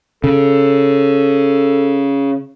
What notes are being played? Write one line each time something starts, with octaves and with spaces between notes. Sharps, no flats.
C#3 A4